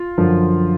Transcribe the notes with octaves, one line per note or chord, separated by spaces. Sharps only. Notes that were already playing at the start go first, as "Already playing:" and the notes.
Already playing: F4
F#2 D3 F3